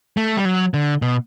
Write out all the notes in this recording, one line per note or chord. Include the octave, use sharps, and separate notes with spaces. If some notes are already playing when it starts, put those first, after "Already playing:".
A3
G3
F#3
D3
B2